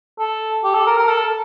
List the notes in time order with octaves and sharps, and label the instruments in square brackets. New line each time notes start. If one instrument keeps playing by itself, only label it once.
[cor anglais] A4
G4
A4
A#4
A#4
A4